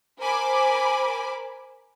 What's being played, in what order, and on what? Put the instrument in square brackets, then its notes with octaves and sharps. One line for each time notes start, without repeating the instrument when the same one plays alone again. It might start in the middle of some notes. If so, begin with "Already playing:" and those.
[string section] A#4 C5 G#5 B5 D6